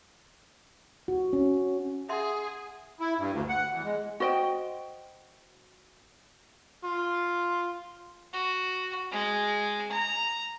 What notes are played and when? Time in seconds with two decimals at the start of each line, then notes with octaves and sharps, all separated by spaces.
1.08 F#4
1.33 C#4
2.09 G#4 E5 F#5 C6
3.00 E4
3.18 G2
3.31 D2
3.49 F#5
3.70 E2
3.84 G#3
4.20 F#4 C5 D#5 G5
6.84 F4
8.33 F#4
9.12 G#3
9.92 A#5